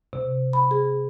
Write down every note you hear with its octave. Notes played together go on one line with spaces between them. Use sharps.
C3
B5
G#4